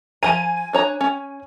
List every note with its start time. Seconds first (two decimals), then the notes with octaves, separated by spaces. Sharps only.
0.23 F3 G#5 A#5 D#7
0.73 D4 C#5 A#5
1.01 C#4